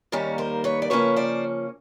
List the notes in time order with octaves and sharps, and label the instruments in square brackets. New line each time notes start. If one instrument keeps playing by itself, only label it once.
[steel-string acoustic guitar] D#2 D#3 G3 A#3 C#4
A#4 C5
B4 C#5
D5
C#3 F3 A#3 C#4 B4 C#5
C5 D5